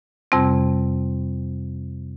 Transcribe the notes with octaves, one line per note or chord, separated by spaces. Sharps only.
F2 C3 G3 C4